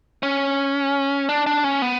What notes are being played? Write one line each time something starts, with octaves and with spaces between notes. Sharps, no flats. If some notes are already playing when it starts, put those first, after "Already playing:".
C#4
D4
D4
C#4
B3